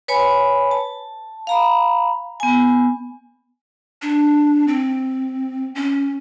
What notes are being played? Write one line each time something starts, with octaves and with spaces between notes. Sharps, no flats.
B4 C#5 G#5 B5
A5
F5 A#5 B5
B3 G#5
D4
C4
C#4